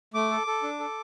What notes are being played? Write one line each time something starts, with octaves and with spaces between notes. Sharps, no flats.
A3 D6
A4
A4
D4
A4